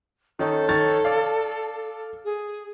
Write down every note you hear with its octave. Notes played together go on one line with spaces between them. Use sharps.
D#3 C#4 D#4 A4
D#3 C#5 A6
D5 F5
G#4